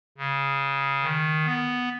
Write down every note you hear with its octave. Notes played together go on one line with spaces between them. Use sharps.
C#3
D#3
B3